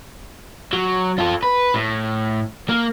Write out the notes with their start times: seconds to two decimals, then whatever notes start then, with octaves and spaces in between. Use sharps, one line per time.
0.73 F#3
1.19 F4 A4
1.43 B4
1.74 A2
2.69 A#3